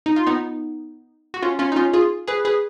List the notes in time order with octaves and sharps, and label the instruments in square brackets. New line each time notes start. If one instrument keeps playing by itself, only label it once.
[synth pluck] D#4
F4
B3 D#4
F#4
C#4 F4
C#4 F4
D#4
C#4 F4
F4 G#4
G#4 B4
G#4 B4